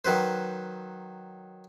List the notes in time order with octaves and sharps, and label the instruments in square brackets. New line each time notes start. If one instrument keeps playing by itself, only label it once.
[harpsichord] D#3 F#3 B4 C5